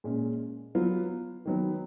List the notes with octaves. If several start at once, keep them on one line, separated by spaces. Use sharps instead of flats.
A#2 G#3 C#4
F#3 B3 F4
D#3 F#3 B3